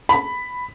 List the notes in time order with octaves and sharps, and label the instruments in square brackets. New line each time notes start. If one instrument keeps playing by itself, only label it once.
[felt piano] B5